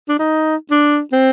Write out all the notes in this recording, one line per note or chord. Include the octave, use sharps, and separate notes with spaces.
D4
D#4
D4
C4